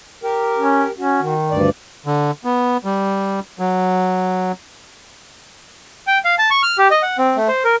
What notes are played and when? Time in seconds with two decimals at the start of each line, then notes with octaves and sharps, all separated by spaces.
0.23 G4 A#4
0.59 C#4
0.99 C#4 F#4
1.23 D#3
1.51 D2 G2 D5
2.06 D3
2.44 B3
2.84 G3
3.59 F#3
6.07 G5
6.25 F5
6.38 A5
6.50 C#6
6.63 F6
6.78 G4
6.91 D#5
7.02 F#5
7.18 C4
7.37 A3
7.48 C5
7.65 A#4